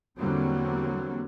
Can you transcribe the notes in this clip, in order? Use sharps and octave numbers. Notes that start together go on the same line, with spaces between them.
E2 D3 F#3 G3 A#3 C4